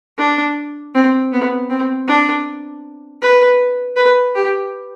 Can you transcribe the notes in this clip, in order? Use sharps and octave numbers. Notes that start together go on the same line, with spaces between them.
D4
C4
B3
C4
D4
B4
B4
G4